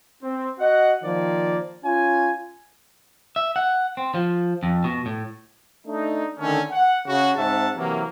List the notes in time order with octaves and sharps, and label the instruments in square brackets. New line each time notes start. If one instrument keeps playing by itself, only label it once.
[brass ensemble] C4
F#4 D#5 F#5
D#3 F3 A#3 D5
C#4 F4 G#5
[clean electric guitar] E5
F#5
C4
F3
F2
B2
A2
[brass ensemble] A3 D4 D#4
D3 D#3 A3 C#4
F#5
C#3 F#4
G#2 C4 E5 F#5 A5
C3 E3 F#3 A#3